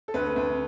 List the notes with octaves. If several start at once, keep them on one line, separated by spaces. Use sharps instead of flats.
A4
D2 B4
D2